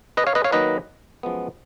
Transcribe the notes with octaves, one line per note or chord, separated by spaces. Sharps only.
B4 D#5
C#5 F5
B4 D#5
C#5 F5
D#3 F#3 A#3 D#4 B4 D#5
F#2 F3 G#3 B3